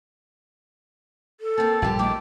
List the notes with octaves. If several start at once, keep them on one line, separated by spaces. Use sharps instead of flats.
A4
A#3 C4 A5
A#1 G2 D3 G3 G4
D#3 A3 A#3 G5 D6